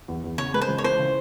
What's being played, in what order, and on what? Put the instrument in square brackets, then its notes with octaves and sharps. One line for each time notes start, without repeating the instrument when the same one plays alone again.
[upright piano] E2
E2
[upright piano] C#3 [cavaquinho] C#5
[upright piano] G#3 [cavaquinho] B4
[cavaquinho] C5
[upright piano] C#2
[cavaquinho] C#5
[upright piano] E3 [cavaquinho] C5
[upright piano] C#3